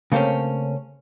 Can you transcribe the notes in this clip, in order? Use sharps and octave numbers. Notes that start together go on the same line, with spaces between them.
C#3 A3 A#3 C4 C#4